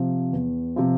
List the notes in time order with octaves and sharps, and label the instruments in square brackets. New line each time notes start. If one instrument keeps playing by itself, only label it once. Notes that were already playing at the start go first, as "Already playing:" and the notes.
Already playing: [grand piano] C3 F3
E2
C3 F3